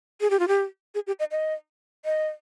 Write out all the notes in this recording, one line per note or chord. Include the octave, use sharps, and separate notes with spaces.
G#4
G4
F4
G4
G#4
G4
D#5
D#5
D#5